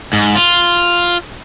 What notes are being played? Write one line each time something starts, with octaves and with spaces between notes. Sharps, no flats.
G#2
F4